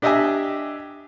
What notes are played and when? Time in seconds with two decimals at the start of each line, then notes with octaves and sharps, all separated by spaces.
0.02 D4 G4 D#5 E5 G5 G#5